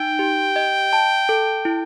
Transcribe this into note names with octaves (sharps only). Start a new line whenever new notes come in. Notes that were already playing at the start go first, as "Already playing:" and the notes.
Already playing: D#4 G5
G4
D#5
A5
A4
E4